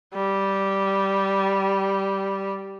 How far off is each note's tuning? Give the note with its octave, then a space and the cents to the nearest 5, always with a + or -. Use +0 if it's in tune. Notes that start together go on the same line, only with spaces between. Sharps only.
G3 -10